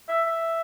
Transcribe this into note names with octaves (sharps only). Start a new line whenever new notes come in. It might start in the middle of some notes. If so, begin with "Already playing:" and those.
E5
E5